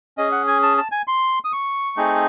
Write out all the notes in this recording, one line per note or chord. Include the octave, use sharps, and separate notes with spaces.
C#4 G#4 D#5
F#5
G#5
A5
A5
G#5
C6
D#6
C#6
A3 C4 D#4 G#4